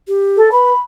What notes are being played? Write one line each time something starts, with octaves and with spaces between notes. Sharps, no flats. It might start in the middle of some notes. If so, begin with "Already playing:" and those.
G4
A4
B4 B5